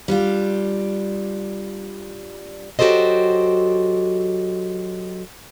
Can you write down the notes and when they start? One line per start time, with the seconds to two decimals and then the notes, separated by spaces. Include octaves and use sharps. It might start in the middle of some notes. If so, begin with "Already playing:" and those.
0.08 G3 D4 F4
2.79 F#3 F#4 G4 A4 C5 D#5